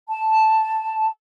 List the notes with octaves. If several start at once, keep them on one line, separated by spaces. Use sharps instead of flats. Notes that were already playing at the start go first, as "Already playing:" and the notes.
A5